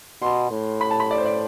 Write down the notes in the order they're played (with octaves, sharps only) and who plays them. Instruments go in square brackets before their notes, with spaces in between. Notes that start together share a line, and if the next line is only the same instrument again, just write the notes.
[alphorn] B2 [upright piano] C6
[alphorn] A2
[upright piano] B5
A5
B5
D5
C5
D5